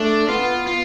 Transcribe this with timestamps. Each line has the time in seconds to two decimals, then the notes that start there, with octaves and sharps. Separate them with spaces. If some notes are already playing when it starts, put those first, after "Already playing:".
Already playing: A3 D4
0.28 B3 F4
0.67 F4